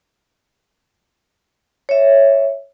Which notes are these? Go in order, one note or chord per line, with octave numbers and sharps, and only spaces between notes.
C#5 E5